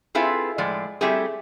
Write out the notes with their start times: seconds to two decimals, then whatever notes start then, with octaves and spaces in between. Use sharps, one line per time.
0.15 C4 E4 F4 G#4 A4 B4
0.58 A2 F3 G#3 D5
1.01 G3 A3 C4 E4 G4 G#4